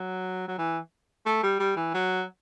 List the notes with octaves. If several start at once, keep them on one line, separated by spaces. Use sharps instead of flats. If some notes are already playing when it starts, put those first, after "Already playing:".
Already playing: F#3
F#3
E3
A3
G3
G3
E3
F#3